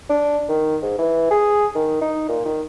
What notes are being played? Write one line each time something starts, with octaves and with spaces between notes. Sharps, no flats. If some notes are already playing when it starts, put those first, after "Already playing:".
D4
D#3
G#2
E3
G#4
D#3
D#4
A#2
D#3